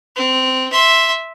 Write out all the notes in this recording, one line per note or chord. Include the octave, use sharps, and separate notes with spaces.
C4
E5 C6